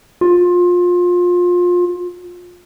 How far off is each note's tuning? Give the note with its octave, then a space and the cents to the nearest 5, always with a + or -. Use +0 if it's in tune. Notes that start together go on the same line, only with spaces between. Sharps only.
F4 +25